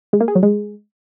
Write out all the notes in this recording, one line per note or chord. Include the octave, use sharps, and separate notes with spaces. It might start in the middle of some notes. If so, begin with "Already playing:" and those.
G#3
A#3
G#4
F#3
G#3